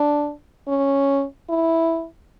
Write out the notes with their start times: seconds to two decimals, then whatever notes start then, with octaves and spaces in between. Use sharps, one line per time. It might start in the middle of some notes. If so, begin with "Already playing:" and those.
Already playing: D4
0.68 C#4
1.49 E4